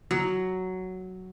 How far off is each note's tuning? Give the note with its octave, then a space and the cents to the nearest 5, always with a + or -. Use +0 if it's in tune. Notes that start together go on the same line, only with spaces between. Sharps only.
F#3 +5